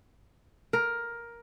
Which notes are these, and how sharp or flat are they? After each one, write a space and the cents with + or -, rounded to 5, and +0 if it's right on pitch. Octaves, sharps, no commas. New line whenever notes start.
A#4 +10